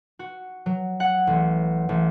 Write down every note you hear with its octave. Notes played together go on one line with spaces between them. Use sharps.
F#4
F#3
F#5
A1
A1